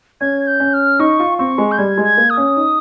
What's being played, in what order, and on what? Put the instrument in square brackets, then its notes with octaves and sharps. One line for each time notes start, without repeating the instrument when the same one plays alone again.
[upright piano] C#4 [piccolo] G#6
[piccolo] G6
[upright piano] C#4
[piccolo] F6
[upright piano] D#4 [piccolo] C#6
[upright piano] F4
[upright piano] C4 [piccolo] C#6
[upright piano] G#3
[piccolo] G6
[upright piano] G3 [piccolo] G#6
[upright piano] G#3
[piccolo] G#6
[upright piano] A#3
[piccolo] D#6
[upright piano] C#4
D#4